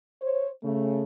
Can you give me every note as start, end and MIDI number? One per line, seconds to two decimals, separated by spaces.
0.22 0.47 72
0.22 0.47 73
0.63 1.04 49
0.63 1.04 57